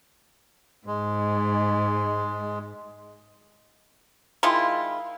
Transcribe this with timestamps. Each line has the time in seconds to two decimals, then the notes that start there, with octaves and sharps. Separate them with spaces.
0.87 G#2 G#3
4.43 D#3 G#3 E4 F4